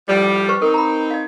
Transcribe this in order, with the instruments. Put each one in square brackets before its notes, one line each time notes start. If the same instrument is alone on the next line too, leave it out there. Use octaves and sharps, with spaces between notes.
[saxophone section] A2 F3 G3
[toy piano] B4 C5 C#6
[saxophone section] C4 D#4 [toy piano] A#4
[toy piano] A#5 B5
D#5 F5